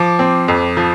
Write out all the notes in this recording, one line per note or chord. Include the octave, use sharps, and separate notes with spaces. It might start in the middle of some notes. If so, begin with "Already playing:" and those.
Already playing: F3 D6
C4
F2
F3